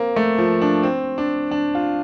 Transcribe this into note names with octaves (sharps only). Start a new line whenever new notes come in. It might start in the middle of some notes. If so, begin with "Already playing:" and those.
Already playing: A#3 C4
A3
F3
D4
C4
D4
D4
F4